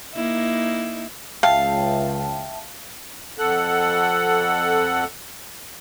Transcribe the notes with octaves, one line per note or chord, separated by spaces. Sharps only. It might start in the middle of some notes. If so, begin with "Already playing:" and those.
A#3 D#4 E4
C#2 E5 F5 G5 A5
F2 A4 F#5